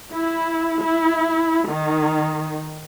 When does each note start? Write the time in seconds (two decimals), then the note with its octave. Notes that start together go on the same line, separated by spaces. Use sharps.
0.12 E4
0.82 E4
1.69 D#3